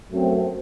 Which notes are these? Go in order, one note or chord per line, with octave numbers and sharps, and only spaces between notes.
F#2 F#3 A3 C4